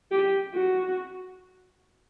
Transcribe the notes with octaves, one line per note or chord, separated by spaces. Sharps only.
G4
F#4